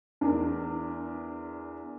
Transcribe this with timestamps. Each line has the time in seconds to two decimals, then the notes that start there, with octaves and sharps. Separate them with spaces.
0.21 E2 D4 A#4